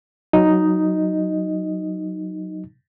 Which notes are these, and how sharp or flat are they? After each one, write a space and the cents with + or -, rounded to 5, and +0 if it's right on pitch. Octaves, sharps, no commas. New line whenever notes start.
F#3 +0 D#4 +0 D#5 +5